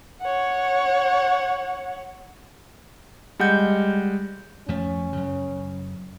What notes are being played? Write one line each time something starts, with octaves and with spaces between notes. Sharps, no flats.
C#5 F#5
G3 G#3 D#5 F#5 G6
F2 F3 A3 C#4
F#2 C#3